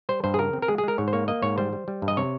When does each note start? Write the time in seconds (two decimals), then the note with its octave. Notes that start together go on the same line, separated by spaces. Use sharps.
0.09 G3 C5
0.24 G2 C5
0.34 G#4
0.39 C#3 A#4
0.53 C4
0.62 A#4
0.68 G#3 G#4
0.78 G#4
0.84 G#3 A#4
0.98 G#2 C#5
1.08 C5
1.13 A#3 C#5
1.28 A#3 D#5
1.42 G#2 C#5
1.58 G3 C5
1.73 G3
1.88 G3
2.02 G2
2.08 D#5
2.17 C3 C#5